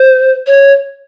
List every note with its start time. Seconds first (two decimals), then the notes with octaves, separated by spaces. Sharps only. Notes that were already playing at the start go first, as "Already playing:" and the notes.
Already playing: C5
0.47 C#5